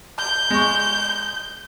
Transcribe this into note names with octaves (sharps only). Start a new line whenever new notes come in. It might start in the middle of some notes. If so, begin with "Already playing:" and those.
G6
G#3 C#6